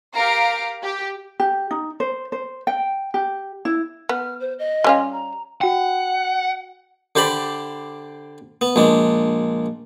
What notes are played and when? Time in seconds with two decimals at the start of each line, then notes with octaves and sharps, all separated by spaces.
0.15 G4 A#4 F5 A#5 D7
0.82 G4
1.40 G4
1.71 D#4
2.00 C5
2.32 C5
2.67 G5
3.14 G4
3.65 E4
4.09 B3 F6
4.40 C5
4.59 D#5
4.84 G3 C#4 F4
5.12 A#5
5.61 F#4 F#5 G5
7.16 D3 G4 C5 D5 B5
8.61 B3
8.76 A#1 G#3 D4